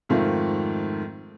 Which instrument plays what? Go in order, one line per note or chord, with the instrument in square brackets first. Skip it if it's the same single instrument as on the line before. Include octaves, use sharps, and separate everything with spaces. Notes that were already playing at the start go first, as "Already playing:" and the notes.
[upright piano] F2 G#2 D#3 A3 C4 F4